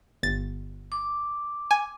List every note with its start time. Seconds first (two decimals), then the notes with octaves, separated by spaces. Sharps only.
0.23 G1 A6
0.92 D6
1.71 G#5